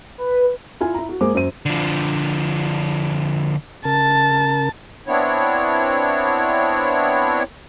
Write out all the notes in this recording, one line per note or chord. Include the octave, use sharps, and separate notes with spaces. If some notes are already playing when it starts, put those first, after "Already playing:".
B4
E4 F4 G#5
E4 A#5
F#4
G#3 A#3 C5 D6
F#2 C5 D#7
D3 F3
C#3 A#4 A5
B3 C4 D4 E4 C#5